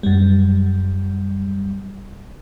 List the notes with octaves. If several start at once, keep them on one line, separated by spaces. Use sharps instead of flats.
F#2 G3